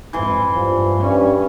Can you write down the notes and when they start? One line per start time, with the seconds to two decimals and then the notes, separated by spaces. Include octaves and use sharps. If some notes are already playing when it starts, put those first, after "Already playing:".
0.13 F2 G#2 E3 C6
0.55 G2 F3
1.01 G2 C#4